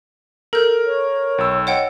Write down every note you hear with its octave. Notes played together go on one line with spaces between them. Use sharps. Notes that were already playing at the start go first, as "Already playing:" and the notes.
A4 A#4 G6
C#5
B1 E6
C#5 D#5 F#5 G5